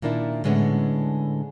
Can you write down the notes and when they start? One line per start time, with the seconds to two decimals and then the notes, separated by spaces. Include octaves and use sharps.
0.02 A#2 D#3 A#3 D4 E4
0.44 A2 D3 G#3 B3 C#4